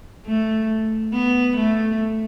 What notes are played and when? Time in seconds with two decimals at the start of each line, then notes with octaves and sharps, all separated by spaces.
0.26 A3
1.13 B3
1.57 A3